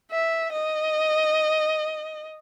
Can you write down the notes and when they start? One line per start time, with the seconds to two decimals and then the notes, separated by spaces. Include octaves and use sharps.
0.11 E5
0.52 D#5